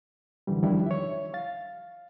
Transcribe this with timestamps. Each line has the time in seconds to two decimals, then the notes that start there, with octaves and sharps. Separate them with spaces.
0.47 F#2 D3 E3 G3
0.63 E2 D#3 F3 G3 D4 E4
0.86 C#5 E5
1.34 F5 A6